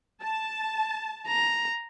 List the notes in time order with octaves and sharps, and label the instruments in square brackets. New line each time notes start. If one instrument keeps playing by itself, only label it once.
[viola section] A5
[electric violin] A#5